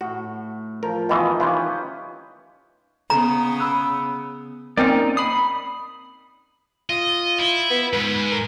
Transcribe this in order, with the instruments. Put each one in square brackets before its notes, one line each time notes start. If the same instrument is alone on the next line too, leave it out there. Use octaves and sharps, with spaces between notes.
[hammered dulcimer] A2 [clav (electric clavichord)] F#4
[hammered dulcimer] F3 [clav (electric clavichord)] A#4
[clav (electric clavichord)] B2 E3 [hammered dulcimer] D#3 F4 D#5
[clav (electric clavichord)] E3 F4 [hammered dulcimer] C#4 G4 B4
[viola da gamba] C#3 B3 [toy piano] A#5
[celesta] B5 E6 F#6
[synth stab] A#3 C4 C#4 [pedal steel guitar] D#4 D5
[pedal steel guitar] B5 D#6 [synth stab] C7
[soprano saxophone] F4 [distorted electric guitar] D#5
[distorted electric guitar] E4
[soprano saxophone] B3
[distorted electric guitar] G#2 [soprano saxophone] B4
[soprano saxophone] A#4